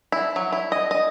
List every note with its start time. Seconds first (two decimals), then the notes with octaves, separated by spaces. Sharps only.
0.12 E4
0.36 F#3
0.52 E4
0.72 D#5
0.91 D#5